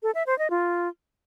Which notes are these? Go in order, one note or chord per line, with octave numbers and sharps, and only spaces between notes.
A4
E5
C5
D#5
F4